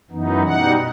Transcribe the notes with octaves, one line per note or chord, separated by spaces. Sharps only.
F#2 E3 B3 D#4
B2 G3 D#4 F#5